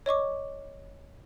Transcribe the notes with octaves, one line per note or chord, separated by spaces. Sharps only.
C#5 D#5 C#6 D6